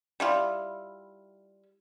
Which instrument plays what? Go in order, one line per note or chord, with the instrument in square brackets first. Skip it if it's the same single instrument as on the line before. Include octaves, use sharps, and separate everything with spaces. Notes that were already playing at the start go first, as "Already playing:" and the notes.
[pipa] G3 E4 F4